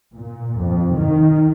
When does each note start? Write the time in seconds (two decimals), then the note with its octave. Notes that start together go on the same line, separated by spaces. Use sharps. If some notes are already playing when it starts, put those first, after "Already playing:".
0.14 A#2
0.62 F2
0.98 D#3